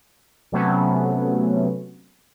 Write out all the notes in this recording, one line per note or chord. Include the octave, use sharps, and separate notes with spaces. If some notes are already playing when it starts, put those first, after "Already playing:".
C3 F#3 A3 B3 C#4